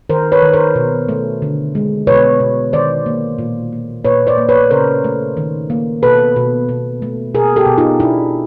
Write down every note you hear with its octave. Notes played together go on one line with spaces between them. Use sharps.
D#3 A#4 C5
B4 C#5
D#3
A#4 C5
B2
A3
D3
G#3
B2 B4 C#5
B2
D#3 C5 D5
A#3
A#2
A#3
A#2 B4 C#5
C5 D5
A#3
B4 C#5
C#3 A#4 C5
A3
D#3
A#3
B2 A4 B4
B2
B2
A3
B2 G#4 A#4
G4 A4
B2
D#4 F4
B2 D4 E4